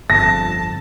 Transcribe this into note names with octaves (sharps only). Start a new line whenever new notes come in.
G1 F2 A5 A#6